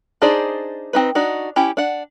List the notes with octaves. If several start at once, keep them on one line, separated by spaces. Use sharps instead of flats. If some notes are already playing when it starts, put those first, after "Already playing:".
D4 D#4 G#4 C5 D5
C4 D#4 B4
D4 D#4 F#4
C#4 E4 G4
D4 F#5